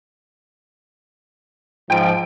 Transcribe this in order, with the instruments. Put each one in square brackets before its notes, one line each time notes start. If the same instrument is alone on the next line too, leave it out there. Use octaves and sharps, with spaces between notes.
[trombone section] G#2 F3 [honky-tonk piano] G5 D7